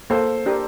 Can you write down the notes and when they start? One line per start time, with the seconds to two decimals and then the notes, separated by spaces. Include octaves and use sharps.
0.10 A#3 A4 C5
0.46 D4 G4 A#4